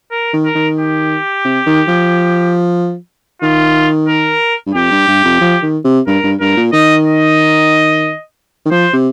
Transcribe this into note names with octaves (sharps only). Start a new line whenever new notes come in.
A#4
D#3
A#4
D#3
G4
C3
D#3
F3
D#3 F4
A#4
G2
F2 G4
G2
G2
F2
F3
D#3
C3
G2 A#4
G2
G2 A#4
A#2
D#3 D#5
D#5
D#3
F3 C5
C3